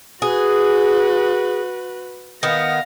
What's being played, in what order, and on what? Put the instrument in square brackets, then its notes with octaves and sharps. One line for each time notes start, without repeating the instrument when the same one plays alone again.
[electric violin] F#4 B4 [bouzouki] G#4
[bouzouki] D#3 B3 [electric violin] F5 A#6